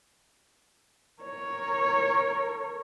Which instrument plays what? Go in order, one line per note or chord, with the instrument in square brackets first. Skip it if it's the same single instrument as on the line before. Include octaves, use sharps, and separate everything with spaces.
[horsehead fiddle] A#4 C#5